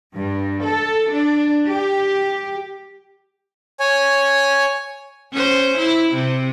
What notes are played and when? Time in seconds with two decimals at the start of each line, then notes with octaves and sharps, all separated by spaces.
0.15 G2
0.63 A4
1.12 D4
1.67 G4
3.79 C#5 G#5
5.33 C#4 C5
5.78 E4
6.14 C3